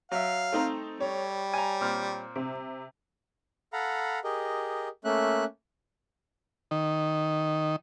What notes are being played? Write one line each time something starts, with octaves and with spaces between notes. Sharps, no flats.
F#3 E5 F5
A3 C4 D#4 C5 A#5
G3 C#5
G#5 A#5
A#2 C4 F6
C3
A4 F5 F#5 A#5 B5
G4 G#4 A#4 D#5
A3 A#3 C#4 E5 F#6
D#3